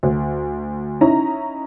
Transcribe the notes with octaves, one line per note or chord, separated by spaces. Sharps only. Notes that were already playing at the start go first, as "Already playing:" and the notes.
D2
C#4 D#4 E4 A#5